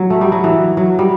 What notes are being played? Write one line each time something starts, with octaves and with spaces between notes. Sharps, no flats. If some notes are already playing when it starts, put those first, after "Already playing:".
Already playing: F#3
A3
G3
F#3
E3
F#3
G3